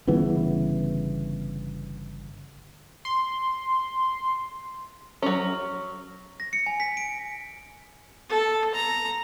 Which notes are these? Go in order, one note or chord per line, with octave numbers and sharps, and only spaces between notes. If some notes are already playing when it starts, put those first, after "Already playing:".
G1 C#3 E3 B3
C6
F#3 C#4
A#6
C#7
G#5
B6
D7
A4
A#5